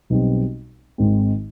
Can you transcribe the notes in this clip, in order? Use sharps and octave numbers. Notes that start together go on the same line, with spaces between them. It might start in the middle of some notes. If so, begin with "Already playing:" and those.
B1 B2 G3 C4
G#1 G#2 D#3 G#3 C4